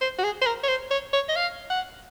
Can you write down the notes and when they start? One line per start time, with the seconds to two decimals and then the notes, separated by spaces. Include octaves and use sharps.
0.01 C5
0.18 F#4
0.24 G#4
0.42 C5
0.46 A#4
0.63 C#5
0.68 C5
0.91 C#5
1.13 C#5
1.29 D#5
1.36 F5
1.70 F#5